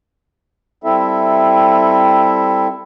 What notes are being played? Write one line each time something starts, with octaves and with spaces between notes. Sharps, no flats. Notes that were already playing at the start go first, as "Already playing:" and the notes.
G3 C4 E4 A4 E5